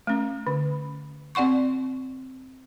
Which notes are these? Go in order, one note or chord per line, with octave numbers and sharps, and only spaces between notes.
A3 C#4
D3
C4 D5 F#5 C6 C#6